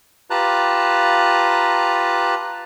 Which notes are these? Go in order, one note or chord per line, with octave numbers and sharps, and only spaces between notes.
F4 G4 B4 A5 A#5 F#6